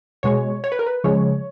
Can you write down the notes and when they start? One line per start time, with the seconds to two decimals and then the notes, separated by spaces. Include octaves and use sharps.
0.23 B2 G#3 C#5
0.64 C#5
0.72 B4
0.79 A#4
0.86 B4
1.04 C#3 F3 G#3 C#5